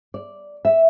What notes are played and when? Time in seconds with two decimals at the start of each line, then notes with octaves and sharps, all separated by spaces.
0.14 D5
0.65 E5